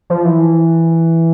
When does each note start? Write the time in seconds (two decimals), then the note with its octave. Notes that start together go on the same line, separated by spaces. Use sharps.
0.10 F3
0.25 E3